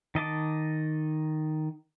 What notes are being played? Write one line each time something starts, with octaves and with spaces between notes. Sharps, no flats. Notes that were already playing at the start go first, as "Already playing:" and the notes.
D#3 D#5 A5 D6